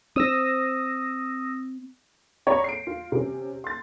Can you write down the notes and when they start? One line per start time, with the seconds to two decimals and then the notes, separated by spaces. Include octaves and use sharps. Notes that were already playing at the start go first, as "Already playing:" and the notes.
0.16 C4 D#6 E6 A#6
2.47 C4 C#5 D5 A#5 B5
2.64 C7 D7
2.87 F4
3.12 C3 C#4
3.64 C6 A6